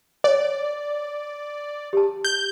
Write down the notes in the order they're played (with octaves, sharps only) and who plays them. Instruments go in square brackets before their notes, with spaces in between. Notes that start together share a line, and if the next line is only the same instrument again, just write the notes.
[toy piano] C#5 [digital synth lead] D5
[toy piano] G4 A5
[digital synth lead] G6